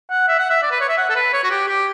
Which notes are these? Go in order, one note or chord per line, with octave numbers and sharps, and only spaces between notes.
F#5
E5
F#5
E5
D5
B4
C#5
E5
F#5
A4
B4
C#5
F#4
G4
G4